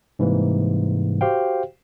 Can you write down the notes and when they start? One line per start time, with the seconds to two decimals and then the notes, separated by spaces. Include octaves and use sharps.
0.19 G#2 C3 E3 G3 A#3
1.21 F#4 G4 C5 F5 G5